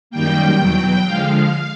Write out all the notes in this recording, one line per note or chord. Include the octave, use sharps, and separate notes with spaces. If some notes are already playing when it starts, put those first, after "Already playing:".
F#2 D#3 G3 A#3 G5
E2 B2 F#3
D3 F3 G#3 F5